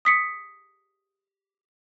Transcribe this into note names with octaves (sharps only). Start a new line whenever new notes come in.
D#6 B6 C#7